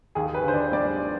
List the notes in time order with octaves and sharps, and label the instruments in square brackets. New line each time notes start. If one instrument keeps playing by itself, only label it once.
[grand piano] D#2 G#4
B4
D3 C5
D5
G3 D5